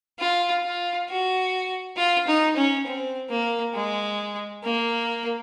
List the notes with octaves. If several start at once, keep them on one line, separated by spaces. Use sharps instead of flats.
F4
F4
F#4
F4
D#4
C#4
C4
A#3
G#3
A#3